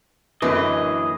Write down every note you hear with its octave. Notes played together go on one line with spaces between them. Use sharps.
F#2 A#2 D3 E3 B4 D#5